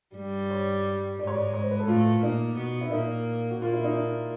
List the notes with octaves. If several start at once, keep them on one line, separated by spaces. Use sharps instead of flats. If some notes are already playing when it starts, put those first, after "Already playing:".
G2 G3
C#5
G#2 G#3 D5
C#5
D5
C#5
C5
B4
A4
A2 A3 F4
A#2 A#3 D#4
B2 B3
E4
A#2 A#3 D#4
F#4
A#2 A#3 F4
E4
D#4
D4